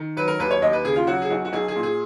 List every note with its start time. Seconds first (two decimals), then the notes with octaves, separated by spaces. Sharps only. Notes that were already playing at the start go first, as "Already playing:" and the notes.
Already playing: D#3
0.17 F#3 B4
0.28 A#4
0.39 D#2 B4
0.51 C#5
0.62 D#2 D#5
0.73 B4
0.85 C#3 G#4
0.96 F4
1.07 F#3 F#4
1.22 G#4
1.30 B1 F#4
1.45 F#4
1.53 B1 G#4
1.68 G#4
1.76 A#2
1.83 G#4